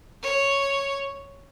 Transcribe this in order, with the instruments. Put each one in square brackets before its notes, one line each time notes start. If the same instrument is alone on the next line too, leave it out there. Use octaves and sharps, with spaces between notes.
[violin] C#5